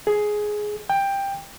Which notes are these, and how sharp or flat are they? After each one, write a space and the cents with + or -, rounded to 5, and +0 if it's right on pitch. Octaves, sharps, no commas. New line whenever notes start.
G#4 +10
G5 +10